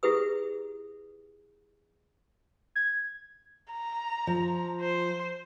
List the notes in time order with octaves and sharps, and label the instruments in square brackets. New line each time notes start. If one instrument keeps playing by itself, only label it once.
[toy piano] E4 G4 G#4 B4 D#6
[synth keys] G#6
[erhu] A#5
[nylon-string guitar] F3
[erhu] C5